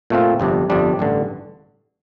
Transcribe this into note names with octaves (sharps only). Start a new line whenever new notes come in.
A#2 A3 C4 F4
G1 F2 C3 G3 D4
G1 F2 C3 G3 D4
A1 G2 D3